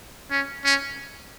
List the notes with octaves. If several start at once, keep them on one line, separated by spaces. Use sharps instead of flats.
C#4
C#4